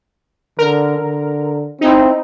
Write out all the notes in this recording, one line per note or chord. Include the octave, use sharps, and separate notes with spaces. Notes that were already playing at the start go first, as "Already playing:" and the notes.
D3 A#4
D3
C4 D#4 E4